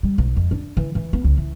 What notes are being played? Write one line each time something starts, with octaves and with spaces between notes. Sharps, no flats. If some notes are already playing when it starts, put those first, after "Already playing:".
G3
B1
F2
D4
E3
E3
B3
C#2
E3